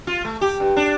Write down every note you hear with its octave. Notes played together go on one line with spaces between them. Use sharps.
F4
A3
G4
G2
D4